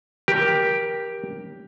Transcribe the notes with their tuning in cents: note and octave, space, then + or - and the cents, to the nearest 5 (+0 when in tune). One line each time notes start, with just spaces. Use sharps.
G4 +0 A#4 +20